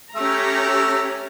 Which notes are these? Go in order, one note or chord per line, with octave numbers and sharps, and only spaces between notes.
A3 C#4 G4 E5 A#5